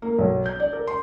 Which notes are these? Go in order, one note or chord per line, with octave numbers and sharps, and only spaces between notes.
A#3
B1
G6
D5
A#4
C6